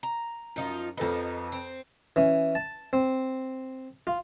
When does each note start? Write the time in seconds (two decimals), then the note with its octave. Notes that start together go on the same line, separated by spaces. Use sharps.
0.03 A#5
0.56 F#2 F3 D#4 F4
0.97 F2 F3 D#4 A4 B4
1.52 C4
2.16 E3 C#4
2.55 A5
2.93 C4
4.07 F4